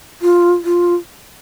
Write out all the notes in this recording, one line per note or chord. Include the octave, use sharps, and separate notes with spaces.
F4
F4